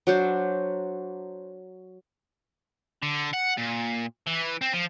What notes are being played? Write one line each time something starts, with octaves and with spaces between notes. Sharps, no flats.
F#3 D4 C5
D3
F#5
A#2
E3
C4
F3